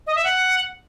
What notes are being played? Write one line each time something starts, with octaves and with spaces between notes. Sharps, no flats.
D#5
E5
F#5